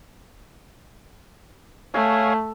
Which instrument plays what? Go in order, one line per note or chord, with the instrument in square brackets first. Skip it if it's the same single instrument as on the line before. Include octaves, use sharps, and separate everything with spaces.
[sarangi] A3 [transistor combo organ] C#5 F5 G#5